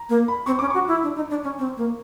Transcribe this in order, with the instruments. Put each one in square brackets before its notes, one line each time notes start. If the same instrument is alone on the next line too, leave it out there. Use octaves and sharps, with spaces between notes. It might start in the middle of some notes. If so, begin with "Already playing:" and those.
Already playing: [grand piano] A#5
[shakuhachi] A#3
[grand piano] B5
[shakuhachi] C4 [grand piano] C#6
[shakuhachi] C#4 [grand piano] D6
[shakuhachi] F#4 [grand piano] C#6
[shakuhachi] E4
D4
D#4
D4
C#4
C4
A#3